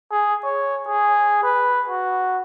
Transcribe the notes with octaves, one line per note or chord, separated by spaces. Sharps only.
G#4
C#5
G#4
B4
F#4